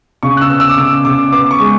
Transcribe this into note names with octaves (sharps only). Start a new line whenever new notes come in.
C#3 C#6
F#6
E6
B3
E6
D6
C#3 E6
C#3 D6
B3 D6
C#6
G#3